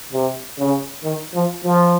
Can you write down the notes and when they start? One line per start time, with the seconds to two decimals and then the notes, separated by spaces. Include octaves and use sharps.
0.13 C3
0.59 C#3
1.03 D#3
1.34 F3
1.63 F3